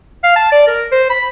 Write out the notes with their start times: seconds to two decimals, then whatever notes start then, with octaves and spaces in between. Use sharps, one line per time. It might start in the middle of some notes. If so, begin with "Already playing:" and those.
0.24 F5
0.36 A5
0.52 D5
0.68 A#4
0.92 C5
1.10 B5